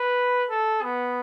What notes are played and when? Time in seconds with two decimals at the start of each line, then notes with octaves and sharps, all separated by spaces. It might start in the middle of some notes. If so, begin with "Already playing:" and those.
Already playing: B4
0.50 A4
0.82 B3